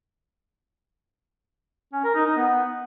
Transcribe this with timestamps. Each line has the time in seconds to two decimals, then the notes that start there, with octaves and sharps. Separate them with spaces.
1.93 C#4
2.04 A#4
2.15 D#4
2.26 D#4
2.37 B3